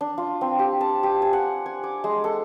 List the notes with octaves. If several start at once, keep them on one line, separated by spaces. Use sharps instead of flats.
D4
F4
C4
G4
A5
G4
G#5
F#5
G#5
D6
G#3
A4